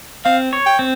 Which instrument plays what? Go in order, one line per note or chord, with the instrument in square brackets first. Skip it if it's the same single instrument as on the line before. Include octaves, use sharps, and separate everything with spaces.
[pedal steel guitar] C4 [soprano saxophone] F5
[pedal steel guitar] C#5
[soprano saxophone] G5
[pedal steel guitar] C4